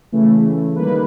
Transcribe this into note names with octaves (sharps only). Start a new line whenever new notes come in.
C#3 E3 A3
D#3 G3 A#3 B4